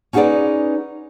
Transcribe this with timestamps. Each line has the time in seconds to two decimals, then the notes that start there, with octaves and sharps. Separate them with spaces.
0.13 C#4 D#4 F#4 G#4 B4 D5